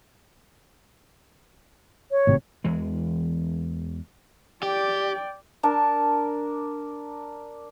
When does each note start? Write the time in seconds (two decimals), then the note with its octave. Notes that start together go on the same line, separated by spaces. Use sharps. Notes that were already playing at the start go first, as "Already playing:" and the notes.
2.11 C#5
2.27 G#1 A2 C3
2.64 E2 E3 G#3
4.63 G4 D5 G5
5.63 D4 A#4 A5